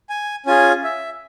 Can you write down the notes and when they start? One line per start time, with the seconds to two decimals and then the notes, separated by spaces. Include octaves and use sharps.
0.09 G#5
0.46 C#4 F4 G#4 G#5
0.84 E5